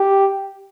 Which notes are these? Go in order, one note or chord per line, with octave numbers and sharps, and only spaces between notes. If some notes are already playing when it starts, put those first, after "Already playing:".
Already playing: G4